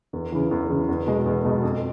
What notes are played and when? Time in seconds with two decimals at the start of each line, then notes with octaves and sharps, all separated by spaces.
0.13 E2
0.32 C#3 E3
0.51 E2
0.70 C#3 E3
0.89 E2
1.07 B2 G#3
1.26 E2
1.45 B2 G#3
1.64 F2